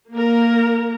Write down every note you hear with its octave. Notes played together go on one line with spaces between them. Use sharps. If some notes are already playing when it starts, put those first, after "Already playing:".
A#3 A#4